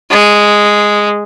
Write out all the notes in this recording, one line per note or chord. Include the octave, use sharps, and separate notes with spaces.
G#3